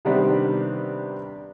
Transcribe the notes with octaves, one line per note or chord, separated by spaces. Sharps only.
C3 D#3 G3 B3 C4 D4